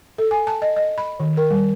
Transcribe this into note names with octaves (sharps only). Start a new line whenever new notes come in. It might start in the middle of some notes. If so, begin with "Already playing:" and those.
A4
G#5
A5
D#5
D#5
B5
D#3
A#4
G3